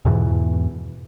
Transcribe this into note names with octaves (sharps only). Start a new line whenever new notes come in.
E2 G#2 B2 E3